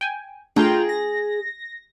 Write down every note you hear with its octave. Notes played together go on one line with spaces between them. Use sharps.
G5 G#5
A3 D4 F4 G#4 G5 A#5
A#6